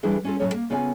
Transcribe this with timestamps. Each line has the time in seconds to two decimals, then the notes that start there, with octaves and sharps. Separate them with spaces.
0.03 E3 G3 D4 E4 G#4 A4
0.25 C#4 F4 A4
0.39 A2 F#3 A3 C#4 A4 C#5
0.54 A#3
0.70 C#3 B3 F4 A4 F#5 G#5